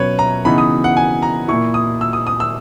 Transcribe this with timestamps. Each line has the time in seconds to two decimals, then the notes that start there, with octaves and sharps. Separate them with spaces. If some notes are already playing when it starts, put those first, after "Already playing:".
Already playing: B2 F#3 C#4 B4 C#5
0.19 A#5
0.45 C#3 E3 B3 D#4 B5
0.58 D#6
0.84 F#5
0.97 G#5
1.22 A#5
1.48 A#2 A#3 E4 C#6
1.74 D#6
2.01 E6
2.13 D#6
2.27 D#6
2.40 E6